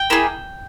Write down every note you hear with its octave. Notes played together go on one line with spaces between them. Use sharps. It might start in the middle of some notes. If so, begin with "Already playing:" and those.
Already playing: G5
A#3 E4 G#4